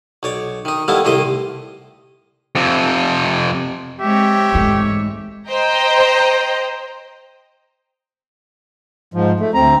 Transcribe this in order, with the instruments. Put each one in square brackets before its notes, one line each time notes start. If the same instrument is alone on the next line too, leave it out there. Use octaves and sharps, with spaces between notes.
[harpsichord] B1 C#5 D5
D#3 D#4
D#3 G3 A#3 B3 E4 A4
C2 A2 D#3 G4 C5 D#5
[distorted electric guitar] F2 C3
[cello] G#3 C4 [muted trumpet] G4 [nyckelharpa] C#5 E5
[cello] G#2 [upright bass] E3 A3
[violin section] C5 D#5 G5 A#5
[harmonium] G#2 F3
A3
D2 C4 A#5